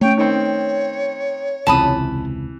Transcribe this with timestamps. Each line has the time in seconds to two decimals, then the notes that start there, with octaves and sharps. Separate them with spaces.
0.01 A3 C#4 C#5 G5
0.17 D#3 C4 C#5
1.67 E1 C#2 C3 E3 A5 B5 D#6